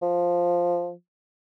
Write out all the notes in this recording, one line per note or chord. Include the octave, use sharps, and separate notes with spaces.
F3